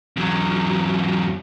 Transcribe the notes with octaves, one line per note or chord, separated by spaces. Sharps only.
E2 F#3